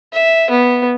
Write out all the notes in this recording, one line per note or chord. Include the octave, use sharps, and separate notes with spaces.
E5
B3